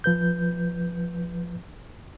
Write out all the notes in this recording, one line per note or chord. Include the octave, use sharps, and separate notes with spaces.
F3 B4 G6